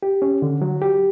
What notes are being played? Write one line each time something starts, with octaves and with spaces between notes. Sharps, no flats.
G4
C#4
D3
F#3
G4